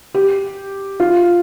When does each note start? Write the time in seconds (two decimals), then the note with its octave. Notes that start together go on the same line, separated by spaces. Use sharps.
0.14 G4
1.00 F4